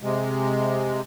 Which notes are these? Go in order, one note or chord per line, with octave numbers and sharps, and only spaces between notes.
C3 G#3